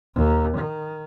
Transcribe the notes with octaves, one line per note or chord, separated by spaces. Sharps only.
D#2
D#3